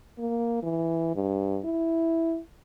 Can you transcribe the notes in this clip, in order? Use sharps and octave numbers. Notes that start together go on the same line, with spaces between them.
A#3
E3
G2
E4